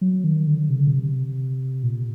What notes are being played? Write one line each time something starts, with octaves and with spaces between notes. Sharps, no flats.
F#3
D#3
D3
C3
C#3
C3
A#2